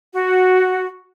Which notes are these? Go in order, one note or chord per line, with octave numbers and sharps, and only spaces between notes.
F#4